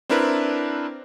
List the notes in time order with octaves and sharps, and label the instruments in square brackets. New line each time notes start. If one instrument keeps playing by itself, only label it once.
[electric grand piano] C4 D4 E4 A#4 B4